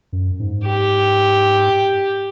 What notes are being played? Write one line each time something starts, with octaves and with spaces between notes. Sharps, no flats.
F#2
G#2
G4